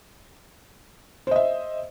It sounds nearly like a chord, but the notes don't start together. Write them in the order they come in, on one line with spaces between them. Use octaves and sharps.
C5 D#5 E5